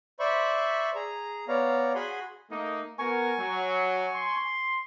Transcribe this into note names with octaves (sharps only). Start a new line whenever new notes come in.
C5 D5 E5 B5 C#6
G#4 A#5
B3 C#5 D5 F5 A#5
F#4 G#4 F#5 G#5 B5 C6
A3 A#3 D#4
B3 F#4 A#4 G#5 C#6
F#3
C6